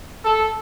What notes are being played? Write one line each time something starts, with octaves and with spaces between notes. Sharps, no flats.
A4